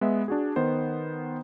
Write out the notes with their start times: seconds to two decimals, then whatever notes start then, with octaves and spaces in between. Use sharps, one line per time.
0.01 G#3 B3 E5
0.28 D4 F#4 G#4
0.56 D#3 B3 C5